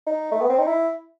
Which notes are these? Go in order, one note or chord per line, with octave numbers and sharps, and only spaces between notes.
D#4
A3
B3
C4
D#4
E4